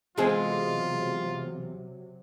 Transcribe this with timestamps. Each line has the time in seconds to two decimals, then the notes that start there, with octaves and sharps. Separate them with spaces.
0.18 E2 C3 F#3 G#3 C4 F4 G#4 G#5